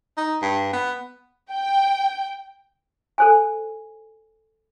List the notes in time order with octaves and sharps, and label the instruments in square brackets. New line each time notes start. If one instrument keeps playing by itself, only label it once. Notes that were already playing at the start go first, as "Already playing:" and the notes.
[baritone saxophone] D#4
G2
B3
[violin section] G5
[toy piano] A4 C5 G#5